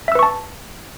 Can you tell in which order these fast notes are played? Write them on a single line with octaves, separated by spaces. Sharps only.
E5 E6 B4 C#6 A5